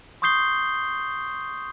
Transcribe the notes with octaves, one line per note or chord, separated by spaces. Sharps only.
C6 C#6 D#6 G6 C7 G7